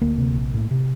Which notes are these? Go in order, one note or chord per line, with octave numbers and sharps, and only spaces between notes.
D2 A#3
C3
A#1
A2
C3